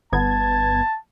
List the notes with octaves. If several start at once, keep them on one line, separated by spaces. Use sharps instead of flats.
G1 B3 A5 G#6